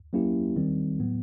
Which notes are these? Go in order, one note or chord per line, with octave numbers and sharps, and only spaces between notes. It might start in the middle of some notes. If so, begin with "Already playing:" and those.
F#3 A#3 C#4 E4 G4
D#3 G3 C4
A2 F#3 B3